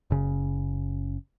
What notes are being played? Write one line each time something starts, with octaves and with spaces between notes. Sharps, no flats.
F#1 C#3